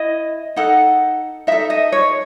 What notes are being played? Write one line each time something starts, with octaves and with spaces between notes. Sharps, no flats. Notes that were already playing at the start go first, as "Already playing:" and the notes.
Already playing: E4 D#5
D#4 A4 F#5
D#4 A4 E5
D#5
C#5